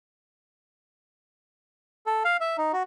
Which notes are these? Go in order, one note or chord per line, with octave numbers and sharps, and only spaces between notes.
A4
F5
E5
D#4
F#4